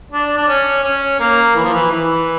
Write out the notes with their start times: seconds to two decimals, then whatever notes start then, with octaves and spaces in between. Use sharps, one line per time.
0.12 D4
0.37 D4
0.48 C#4
0.84 C#4
1.19 A#3
1.55 E3
1.64 F3
1.73 E3
1.91 E3